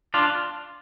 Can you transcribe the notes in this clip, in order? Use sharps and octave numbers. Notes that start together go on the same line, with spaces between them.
D4 F4